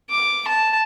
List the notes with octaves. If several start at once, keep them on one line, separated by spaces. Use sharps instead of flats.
D6
A5